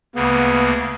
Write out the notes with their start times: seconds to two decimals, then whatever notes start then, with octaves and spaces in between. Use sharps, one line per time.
0.15 D2 C#3 A#3 B3